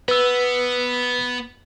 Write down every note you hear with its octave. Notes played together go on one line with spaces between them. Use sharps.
B3 B4 E6